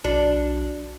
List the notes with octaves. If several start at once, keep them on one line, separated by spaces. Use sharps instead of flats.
B1 D4 F#4